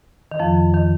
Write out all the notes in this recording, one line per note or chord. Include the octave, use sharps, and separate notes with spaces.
D#3
F2 F3
D#3